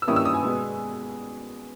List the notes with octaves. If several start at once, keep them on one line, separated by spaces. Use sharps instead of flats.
E6
G2 D#3 A#3 C#4 E4 D#6
E6
D#6
G#5
B2 G#3 B3